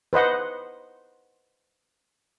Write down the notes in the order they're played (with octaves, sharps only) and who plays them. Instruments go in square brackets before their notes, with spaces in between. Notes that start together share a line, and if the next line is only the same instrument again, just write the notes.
[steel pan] B4 C5 D#5 F#5